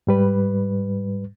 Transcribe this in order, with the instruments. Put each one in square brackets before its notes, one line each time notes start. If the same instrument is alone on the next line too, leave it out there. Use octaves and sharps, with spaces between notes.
[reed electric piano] G#2 G3 B4